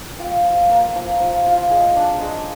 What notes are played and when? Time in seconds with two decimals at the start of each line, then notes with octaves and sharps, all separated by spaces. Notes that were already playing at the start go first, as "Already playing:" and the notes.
0.19 F4 G5
0.44 F3
0.70 A#3
0.95 F3
1.20 F3
1.46 F4
1.70 G#3 G#5
1.96 D4
2.21 G#3